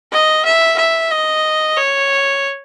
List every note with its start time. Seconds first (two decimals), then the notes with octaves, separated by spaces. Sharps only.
0.13 D#5
0.45 E5
0.78 E5
1.11 D#5
1.77 C#5